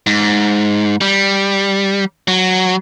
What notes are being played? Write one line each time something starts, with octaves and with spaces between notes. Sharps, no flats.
G#2
G3
F#3